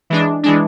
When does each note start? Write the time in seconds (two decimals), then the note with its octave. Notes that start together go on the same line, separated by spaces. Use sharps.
0.10 E3 G#3 D4
0.43 E3 G#3 D4